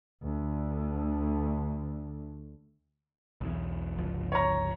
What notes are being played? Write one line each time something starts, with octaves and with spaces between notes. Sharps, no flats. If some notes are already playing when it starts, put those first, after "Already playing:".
D2 D3
B1 E2
G1 C#2 F3
C#5 A#5